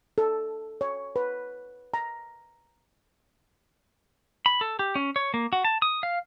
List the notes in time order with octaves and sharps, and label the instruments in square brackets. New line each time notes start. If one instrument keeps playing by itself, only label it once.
[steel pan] A4
C#5
B4
A#5
[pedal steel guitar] B5
A4
G4
C#4
C#5
A#3
F#4
A5
D#6
F5